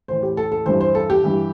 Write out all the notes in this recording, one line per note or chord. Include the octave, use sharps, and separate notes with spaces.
A2 E3 C5
G4
A4
A4
G2 E3 C5
C5
A4
G4
G2 E3